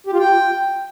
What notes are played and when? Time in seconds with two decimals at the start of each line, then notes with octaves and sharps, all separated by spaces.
0.07 G4
0.13 F4
0.19 G5